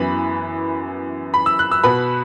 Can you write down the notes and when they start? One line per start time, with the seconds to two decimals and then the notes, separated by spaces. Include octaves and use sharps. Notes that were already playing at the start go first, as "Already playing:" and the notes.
Already playing: F#2 E3 B3 B5
1.34 B5
1.46 E6
1.59 F#6
1.71 E6
1.84 B2 B3 B5